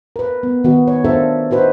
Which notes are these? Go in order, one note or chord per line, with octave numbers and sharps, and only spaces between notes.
A#4 B4
B3
D#3 B3 F#4
C#5
D4 F4 A4 A#4 C5 E5
D#4 F#4 B4 C5